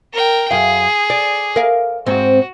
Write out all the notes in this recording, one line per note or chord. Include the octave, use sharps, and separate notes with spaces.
A#4 G5
F#2 G#4 F5
D5
A#4 F5
G#2 C4 F#4